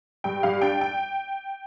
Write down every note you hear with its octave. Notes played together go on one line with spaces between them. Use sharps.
G2 G5
G2 F5
D4 G5
G5